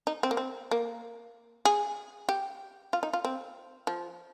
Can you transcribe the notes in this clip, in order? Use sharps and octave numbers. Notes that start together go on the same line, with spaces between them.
D#4
C4
A#3
C4
A#3
G#4
G4
F4
D#4
F4
C4
F3